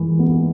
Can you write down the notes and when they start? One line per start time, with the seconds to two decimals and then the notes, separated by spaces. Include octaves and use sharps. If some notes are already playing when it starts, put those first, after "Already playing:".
Already playing: G#2 E3
0.19 B3